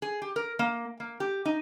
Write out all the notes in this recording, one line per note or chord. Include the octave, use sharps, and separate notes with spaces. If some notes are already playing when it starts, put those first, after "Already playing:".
G#4
G4
A#4
A#3
A#3
G4
D#4